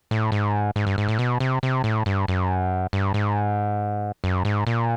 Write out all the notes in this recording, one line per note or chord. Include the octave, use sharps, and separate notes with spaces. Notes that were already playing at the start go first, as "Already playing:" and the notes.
A2
G#2
G#2
G2
G#2
A2
B2
C3
C3
A2
G2
F#2
G2
G#2
F#2
G#2
A#2